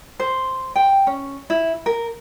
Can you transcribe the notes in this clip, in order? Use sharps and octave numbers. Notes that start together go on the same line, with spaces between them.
C5
G5
C#4
E4
A#4